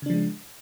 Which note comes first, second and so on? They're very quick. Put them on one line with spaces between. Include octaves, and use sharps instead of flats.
C#3 D4 F3 G#3